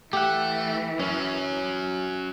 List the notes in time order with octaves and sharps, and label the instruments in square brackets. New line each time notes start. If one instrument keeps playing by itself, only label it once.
[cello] E3 [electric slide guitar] A3 [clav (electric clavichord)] G4 F#5
[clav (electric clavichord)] F#2 [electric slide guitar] F#3 C#4